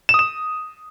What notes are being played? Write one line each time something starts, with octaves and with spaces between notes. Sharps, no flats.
E7
D#6
E7